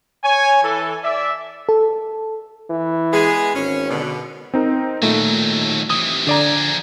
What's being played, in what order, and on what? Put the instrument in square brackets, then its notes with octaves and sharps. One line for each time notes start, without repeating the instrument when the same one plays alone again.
[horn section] C#5 G#5
E3 A4
D5 E5
[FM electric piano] A4
[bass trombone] E3
[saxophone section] G#3 B3 G#4
[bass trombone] G#1 [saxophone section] C#4
[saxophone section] B2 D3
[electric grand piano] C4 D#4 A#4
[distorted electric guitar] D#2 F#3 [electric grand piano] A#2 A3 D#4
[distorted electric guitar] C3 E3 [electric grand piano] D#6
[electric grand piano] D3 D5 A#5 [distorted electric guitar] F3 G#4